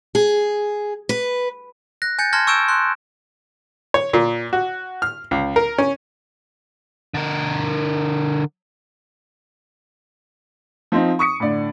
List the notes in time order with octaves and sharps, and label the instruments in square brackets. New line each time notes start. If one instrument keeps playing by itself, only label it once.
[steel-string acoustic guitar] G#4
B4
[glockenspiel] F#6 A#6
G#5 G6 A6 C#7
A5 C6 F6 G#6 A#6
C#6 E6 G6 D7 E7
C6 F#6
[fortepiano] C#5
A#2
F#4
F6
C#2
A#4
C#4
[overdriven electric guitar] D3 A#4
[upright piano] F3 C4 D#4
C#6 D#6 C#7
A2 D3 D5